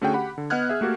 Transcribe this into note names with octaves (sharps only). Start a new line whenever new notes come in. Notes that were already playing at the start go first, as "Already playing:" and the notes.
D3 A3 C#4 F#4 G#4 G5
G4 F#5 B5
D3
B3 D#5 F#5 F6 F#6 G#6
G#4 E5
A3 A#3 F#4 G4 A4